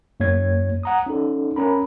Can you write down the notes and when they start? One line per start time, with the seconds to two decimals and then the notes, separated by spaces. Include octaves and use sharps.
0.20 F#2 A#3 C#5 G#6
0.83 F#5 A#5 D#6
1.06 C#4 D#4 A4
1.56 C#4 A#4 A#5 B5